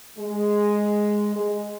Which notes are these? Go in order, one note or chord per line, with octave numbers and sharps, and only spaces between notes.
G#3
G#3